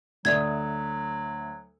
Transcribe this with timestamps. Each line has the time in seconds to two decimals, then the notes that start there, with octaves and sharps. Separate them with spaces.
0.25 D2 F#3 D5 E5 D#6 G#6